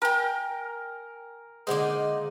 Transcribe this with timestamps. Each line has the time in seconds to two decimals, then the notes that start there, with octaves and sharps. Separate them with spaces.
0.02 A#4 G5 G#5 A#5
1.67 D3 G#3 A#3 D#4 C5 D5 F#5 D#6